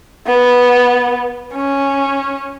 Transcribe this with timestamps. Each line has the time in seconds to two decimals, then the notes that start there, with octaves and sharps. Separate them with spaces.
0.26 B3
1.54 C#4